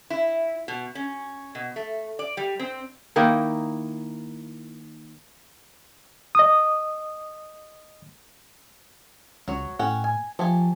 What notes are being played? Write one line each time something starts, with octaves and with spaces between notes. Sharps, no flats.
E4
B2
C#4
B2
A3
D5
G3
C4
D#3 A#3 D#4 E4
D#5 D#6
C#2 F#3 C#5
A2 C#4 F#5 G5
G#5
F3 A3 G4 G#5